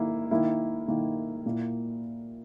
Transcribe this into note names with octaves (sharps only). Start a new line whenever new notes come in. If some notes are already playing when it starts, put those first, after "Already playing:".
Already playing: D#3 A#3 E4
D#3 A#3 E4
D#3 A#3 E4
A#2 A#3 E4